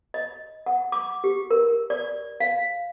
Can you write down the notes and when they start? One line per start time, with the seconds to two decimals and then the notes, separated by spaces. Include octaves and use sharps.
0.14 D#5
0.66 F#5
0.92 D6
1.24 G4
1.51 A#4
1.90 D5
2.40 F5